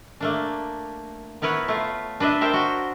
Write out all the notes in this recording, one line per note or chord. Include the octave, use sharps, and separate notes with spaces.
A3 A#3 D4
B3 E4 A#4 B4 C#5
A3 F4
D4 B4 D#5 E5
A#4 C5 E5 G5 A5
F#4